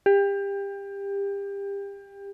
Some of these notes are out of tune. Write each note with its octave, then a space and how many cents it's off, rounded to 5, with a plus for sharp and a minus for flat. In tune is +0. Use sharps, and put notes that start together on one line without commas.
G4 +25